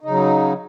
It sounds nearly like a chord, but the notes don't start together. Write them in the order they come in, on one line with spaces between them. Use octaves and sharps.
D#4 C#3 F#3